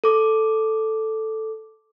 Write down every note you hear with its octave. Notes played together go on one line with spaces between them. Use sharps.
A4 D6